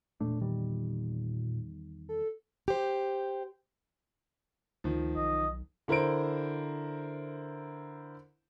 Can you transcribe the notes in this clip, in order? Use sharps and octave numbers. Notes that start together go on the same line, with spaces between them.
E1 A#2 A3 D4
E2 D#3 G3
A4
G4 C5
D2 D#3 F3
B1 D#5
D3 E4 A#4 C5 D7